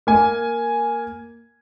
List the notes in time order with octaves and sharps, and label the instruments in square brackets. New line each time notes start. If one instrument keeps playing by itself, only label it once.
[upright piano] A#3 G#5